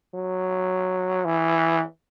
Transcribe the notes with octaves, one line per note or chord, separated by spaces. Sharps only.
F#3
E3